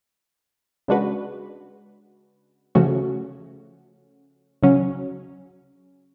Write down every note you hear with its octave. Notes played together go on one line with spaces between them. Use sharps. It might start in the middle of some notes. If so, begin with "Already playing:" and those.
C#3 G#3 D4 F#4 B4
C#3 F3 A3 C#4 F#4
C#3 F#3 C#4